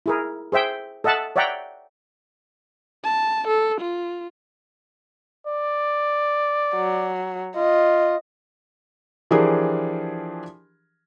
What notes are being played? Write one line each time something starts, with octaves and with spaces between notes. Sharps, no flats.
E4 G#4 A#4
G#4 C5 E5 G5
A4 D#5 E5 F#5 A5
C#5 D5 E5 F#5 G5 A#5
A5
A4
F4
D5
F#3
F4 D#5
E3 F3 D4 G4 G#4 A#4